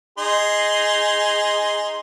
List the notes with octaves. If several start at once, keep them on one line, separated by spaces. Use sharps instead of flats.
D#4 G#4 C6